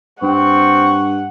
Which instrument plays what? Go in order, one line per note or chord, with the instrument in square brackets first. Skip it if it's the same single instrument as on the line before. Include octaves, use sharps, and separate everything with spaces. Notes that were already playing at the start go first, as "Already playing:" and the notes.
[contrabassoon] G2 [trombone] C4 [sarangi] F#5 [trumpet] C#6